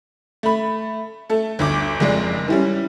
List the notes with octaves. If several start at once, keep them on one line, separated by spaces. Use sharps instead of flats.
A3 B5
A3 A4
G1 D2 D6
F#1 F2 G#3 D5
E3 G3 C#4